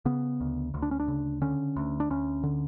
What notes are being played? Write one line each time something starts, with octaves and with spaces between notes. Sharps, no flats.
C#3 B3
D2
D2
D4
C#4
D4
C#3
D3 C#4
D2
D4
D2 C#4
D3